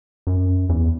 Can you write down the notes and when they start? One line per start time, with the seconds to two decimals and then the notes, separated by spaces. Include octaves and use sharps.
0.27 F#2
0.69 E2